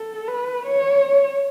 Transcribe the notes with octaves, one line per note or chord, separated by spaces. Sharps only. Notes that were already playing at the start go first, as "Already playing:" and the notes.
Already playing: A4
B4
C#5